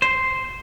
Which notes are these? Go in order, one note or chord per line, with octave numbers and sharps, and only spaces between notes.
C5